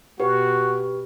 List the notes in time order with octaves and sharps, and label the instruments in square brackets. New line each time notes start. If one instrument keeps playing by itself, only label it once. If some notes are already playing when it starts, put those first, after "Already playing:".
[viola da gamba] B2 [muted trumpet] F#4 [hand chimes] G4 B4